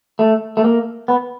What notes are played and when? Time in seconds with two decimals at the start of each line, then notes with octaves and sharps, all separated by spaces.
0.19 A3
0.57 A3
0.64 A#3
1.08 B3